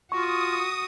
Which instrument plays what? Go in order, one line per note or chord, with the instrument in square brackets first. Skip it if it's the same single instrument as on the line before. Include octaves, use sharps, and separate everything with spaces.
[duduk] F4 [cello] F#4 [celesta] C#6 [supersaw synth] D#6